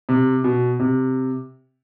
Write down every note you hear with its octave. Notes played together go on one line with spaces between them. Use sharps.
C3
B2
C3